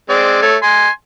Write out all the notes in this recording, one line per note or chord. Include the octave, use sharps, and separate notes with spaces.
G#3 C4 D5
A3 C#5
G#5 C6